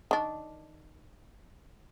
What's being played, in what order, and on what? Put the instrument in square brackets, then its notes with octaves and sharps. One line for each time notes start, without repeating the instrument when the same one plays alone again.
[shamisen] D#3 D4